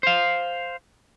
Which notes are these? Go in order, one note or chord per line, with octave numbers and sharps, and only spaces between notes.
C5 F5